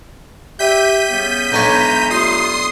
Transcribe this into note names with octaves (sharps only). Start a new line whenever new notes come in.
G4 E5 G6 B6 D#7
C#3 G3 B3
B1 E3 G#3 D4 C#5 A#5
G3 A3 F4 C6 D#6 C7